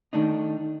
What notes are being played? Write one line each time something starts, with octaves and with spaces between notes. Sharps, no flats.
D#3 A3 D4 D#4